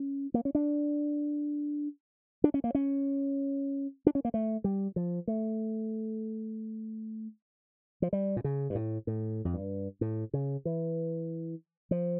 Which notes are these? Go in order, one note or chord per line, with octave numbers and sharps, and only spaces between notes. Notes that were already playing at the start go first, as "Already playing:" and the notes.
Already playing: C#4
A#3
C#4
D4
D4
C#4
A#3
C#4
D4
C#4
A#3
A3
G3
F3
A3
F3
G3
A#2
C#3
G2
A2
A2
F2
G2
A2
C#3
E3
F3